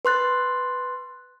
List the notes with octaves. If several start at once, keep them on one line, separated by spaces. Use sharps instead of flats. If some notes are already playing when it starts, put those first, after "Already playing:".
B4 C6 F#6 A6